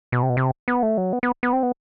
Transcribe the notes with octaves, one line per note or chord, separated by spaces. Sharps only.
B2
C3
B2
C3
B3
A3
F#3
B3
B3
B3
C4
B3